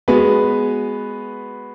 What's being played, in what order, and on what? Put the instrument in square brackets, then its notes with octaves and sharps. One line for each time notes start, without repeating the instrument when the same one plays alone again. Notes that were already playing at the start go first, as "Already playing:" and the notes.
[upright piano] G#3 B3 F#4 B4